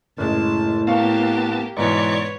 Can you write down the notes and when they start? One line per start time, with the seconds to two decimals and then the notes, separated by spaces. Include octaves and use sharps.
0.18 F#1 A2 G#3 A5
0.87 A#3 B3 G4 F5 A5 C#6
1.77 G#2 B2 E3 B4 C#5 D5 C#6